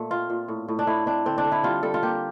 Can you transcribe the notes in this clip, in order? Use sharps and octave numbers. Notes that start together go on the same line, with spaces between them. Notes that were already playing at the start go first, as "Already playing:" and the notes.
Already playing: A#2 A3
C4 F4
A#2
A2
A2
D4
A2 E4
C4 D4
D3 C4
D4
D3
E4
G3 F4
G3 A4
F4
A#3 G4